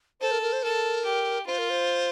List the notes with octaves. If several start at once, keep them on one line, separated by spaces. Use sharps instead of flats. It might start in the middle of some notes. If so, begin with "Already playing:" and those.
A4 C5
A#4
A#4
C5
A4 A#4
G4
F4 C5
A#4
C5